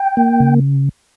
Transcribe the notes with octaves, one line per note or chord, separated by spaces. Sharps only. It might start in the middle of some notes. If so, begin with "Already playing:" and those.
Already playing: G5
A#3
C#3